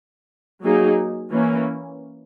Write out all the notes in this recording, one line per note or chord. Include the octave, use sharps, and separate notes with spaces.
F#3 A#3 D#4 G#4
E3 A#3 C#4